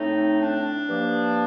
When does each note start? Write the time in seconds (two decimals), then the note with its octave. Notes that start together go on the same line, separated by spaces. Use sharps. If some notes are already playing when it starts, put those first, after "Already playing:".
Already playing: A2 A3 C4 D#4
0.41 D4
0.88 G2 F3 A#3